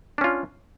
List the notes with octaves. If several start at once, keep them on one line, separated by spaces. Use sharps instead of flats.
C#4 D4 F4